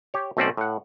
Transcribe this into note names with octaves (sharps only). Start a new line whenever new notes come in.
G4 C#5
B1 A3 C4 C#4 C5 D5
A2 F#5